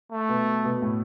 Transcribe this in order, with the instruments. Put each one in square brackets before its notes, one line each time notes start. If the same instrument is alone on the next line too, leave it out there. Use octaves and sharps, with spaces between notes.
[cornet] A3
[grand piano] B2 B3
B2 B3
A2 A3